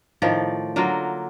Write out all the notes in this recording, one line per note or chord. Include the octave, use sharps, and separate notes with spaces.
A2 D#3 F3 D5
D3 F#3 A#3 F4